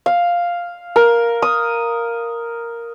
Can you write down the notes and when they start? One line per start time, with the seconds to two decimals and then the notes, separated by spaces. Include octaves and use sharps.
0.06 F5
0.96 A#4
1.42 D#6